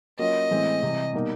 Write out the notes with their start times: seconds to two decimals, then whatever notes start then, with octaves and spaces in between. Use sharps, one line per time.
0.19 F#3 A#3 C#4 F4 D#5
0.51 A2 E3 G#3 C4
0.82 C3 E3 G3
1.14 B2 G3 A#3 D#4